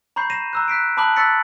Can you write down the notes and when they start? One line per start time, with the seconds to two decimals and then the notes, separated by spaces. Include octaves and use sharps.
0.16 A#5 B5 C#6 G6 C7
0.30 A#6 C7 D#7 E7
0.53 A#5 E6 F#6
0.68 F#6 B6 C7 D7
0.97 A5 B5 D6 D#6 F#6 F#7
1.16 C#6 E6 F#6 A6 B6 C#7